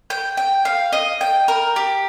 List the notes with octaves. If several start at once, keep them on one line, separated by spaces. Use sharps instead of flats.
G5
G5
F5
D#5
G5
A#4
G4